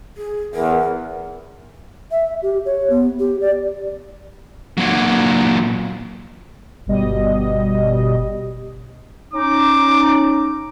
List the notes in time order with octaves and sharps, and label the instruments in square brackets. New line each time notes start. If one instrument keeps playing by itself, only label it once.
[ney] G#4
[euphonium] E2 [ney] A#4
[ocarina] E5
G4
C#5
B3
G4
D5
[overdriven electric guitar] A#2 F#3
[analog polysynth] G1 B2 G3 D#5
[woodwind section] C#4 D#4 [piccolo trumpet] D6